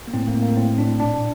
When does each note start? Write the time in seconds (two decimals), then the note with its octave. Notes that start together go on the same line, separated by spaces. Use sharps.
0.08 A#3
0.14 A2 C4
0.28 A#3
0.35 A2
0.42 A#3
0.57 A2 C4
0.78 A2 D4
1.00 A#2 D4